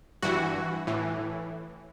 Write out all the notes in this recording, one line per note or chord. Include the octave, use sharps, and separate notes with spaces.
G2 E3 F#4
A2 E3